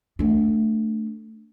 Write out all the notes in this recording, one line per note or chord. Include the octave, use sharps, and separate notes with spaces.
A3 D4